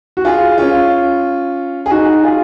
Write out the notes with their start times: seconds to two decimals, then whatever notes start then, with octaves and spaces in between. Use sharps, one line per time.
0.17 F#4
0.25 F4 G#4
0.58 C#4 F4
1.86 G#4
1.91 D#4 F#4
2.23 F4 G#4